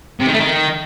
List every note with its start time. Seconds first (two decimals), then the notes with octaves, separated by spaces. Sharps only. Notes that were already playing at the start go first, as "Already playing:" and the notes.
0.20 C3
0.26 D#3
0.33 A3
0.39 D#3